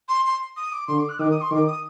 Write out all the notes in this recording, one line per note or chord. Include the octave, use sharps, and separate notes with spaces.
C6
C6
D#6
D6
D3 C6
D6
F#6
D#3 D6
D#6
C6
D#3 D6
D#6